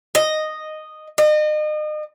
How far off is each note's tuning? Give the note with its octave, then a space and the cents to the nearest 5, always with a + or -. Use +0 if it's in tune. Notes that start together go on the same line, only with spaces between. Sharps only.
D#5 -5
D#5 -35